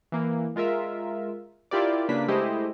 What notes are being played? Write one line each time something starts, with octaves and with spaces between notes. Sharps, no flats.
E3 A#3
G#3 F4 A#4 E5
E4 F4 G4 A#4 D5
C#3 A#3 D4 B4 B6
G#3 A3 E4 G4 C5 D#5